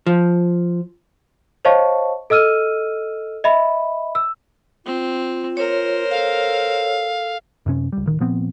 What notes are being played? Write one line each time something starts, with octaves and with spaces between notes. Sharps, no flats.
F3
C5 C#5 D#5 F5 A5 C#6
A4 D#5 E6 F6 D#7
D#5 E5 B5
E6
C4 F4
A#4 C5 C#5
A4 F5
F#2 C3 C#4
C#2 G3
D1 D#3
A#2 F3 B3 C4